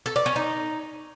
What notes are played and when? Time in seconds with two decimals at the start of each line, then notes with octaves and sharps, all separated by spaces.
0.06 A4
0.16 D5
0.26 C#4
0.36 D#4